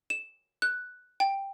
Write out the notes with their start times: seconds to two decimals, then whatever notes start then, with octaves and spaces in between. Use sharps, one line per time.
0.10 E7
0.62 F#6
1.20 G5